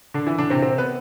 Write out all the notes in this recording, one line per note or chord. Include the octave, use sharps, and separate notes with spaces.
D3 D4
E3 E4
D3 D4
C3 C4
C3 C4
B3 B4